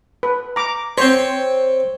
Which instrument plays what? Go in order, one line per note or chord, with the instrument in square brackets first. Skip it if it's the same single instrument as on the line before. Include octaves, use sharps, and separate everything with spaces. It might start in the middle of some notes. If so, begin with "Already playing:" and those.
[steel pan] B4
A#5 D6
[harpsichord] C4 C#5 [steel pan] C5